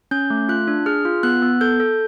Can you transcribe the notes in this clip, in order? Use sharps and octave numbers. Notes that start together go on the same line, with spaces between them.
C#4 G6
A3
F4 F#6
D4
G#4 F6
F4
B3 F#6
B3
A4 G6
A4